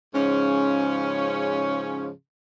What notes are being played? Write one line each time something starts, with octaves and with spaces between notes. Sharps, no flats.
G#2 C#3 F3 C#4